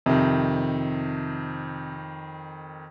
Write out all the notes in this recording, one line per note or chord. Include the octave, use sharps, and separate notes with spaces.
F2 C3 D#3